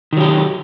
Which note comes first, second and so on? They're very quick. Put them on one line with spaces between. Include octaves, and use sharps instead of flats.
D#3 F#3 G4